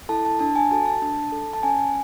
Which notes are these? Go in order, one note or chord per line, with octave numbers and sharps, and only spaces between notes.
E4 A4 A5
A5
D4 A5
G#5
F#4 A4 A5
A5
D4
A4
A5
C#4 G#5